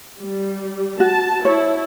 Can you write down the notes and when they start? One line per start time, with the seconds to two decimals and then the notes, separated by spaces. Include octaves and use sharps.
0.19 G3
1.00 F#4 A5
1.45 E4 C#5